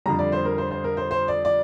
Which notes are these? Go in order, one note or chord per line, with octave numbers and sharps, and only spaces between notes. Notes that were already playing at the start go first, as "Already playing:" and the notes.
F2 D3 G3 A#5
D5
C5
A#4
C5
C5
A#4
C5
C5
D5
D5